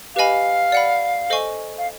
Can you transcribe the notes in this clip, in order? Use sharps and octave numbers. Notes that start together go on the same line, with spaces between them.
G4 B4 D#5 F5 G#5 B5
D5 F#5 B5
A4 C5 D#5 G#5 C#6
F5